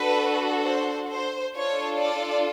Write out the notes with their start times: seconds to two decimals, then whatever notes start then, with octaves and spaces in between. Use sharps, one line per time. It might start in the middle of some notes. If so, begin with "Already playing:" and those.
Already playing: D4 F#4 A4 B4
0.65 C5
1.10 C5
1.55 D4 F4 A4 C#5
2.01 D5